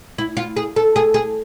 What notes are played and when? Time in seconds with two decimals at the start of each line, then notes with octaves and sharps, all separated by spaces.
0.18 E4
0.37 F4
0.57 G#4
0.76 A4
0.96 G#4
1.14 G#4